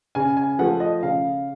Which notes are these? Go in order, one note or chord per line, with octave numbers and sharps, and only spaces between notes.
C#3 G#5
G#5
F3 A3 F#5
D#5
C#3 F5